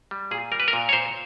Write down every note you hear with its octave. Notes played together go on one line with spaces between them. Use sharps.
G3
A#2 G#4
G3 A#4
B4
A#4
A#2
C#5
A#2 C5